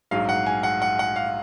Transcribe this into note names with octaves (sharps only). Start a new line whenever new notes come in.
A#1 G#2 F#3 F5
F#5
G#5
F#5
F#5
F#5
F5